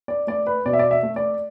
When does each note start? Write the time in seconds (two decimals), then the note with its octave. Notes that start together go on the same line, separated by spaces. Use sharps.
0.08 D5
0.27 A3 D5
0.47 B4
0.66 B2 D5
0.73 E5
0.79 D5
0.91 E5
1.03 A3
1.16 D5